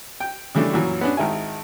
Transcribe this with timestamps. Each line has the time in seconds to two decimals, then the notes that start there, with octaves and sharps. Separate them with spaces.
0.20 G5
0.55 C#3 E3 G3 A3 D4
0.74 F#2 A#2 E3 F#3
1.01 B3 C#4 D4
1.17 G#1 D#3 E4 G#5